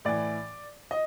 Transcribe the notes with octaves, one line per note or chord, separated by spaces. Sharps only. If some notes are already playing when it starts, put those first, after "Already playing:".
A2 E3 D5
D#5